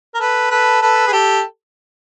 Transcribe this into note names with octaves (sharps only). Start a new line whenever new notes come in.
A#4
A4 B4
A4 B4
A4 B4
G#4
G4 A4